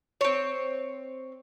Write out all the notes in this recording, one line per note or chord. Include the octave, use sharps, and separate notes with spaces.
C4 C#5